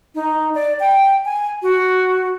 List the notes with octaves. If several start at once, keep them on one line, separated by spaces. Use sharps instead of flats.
D#4
D5
G5
G#5
F#4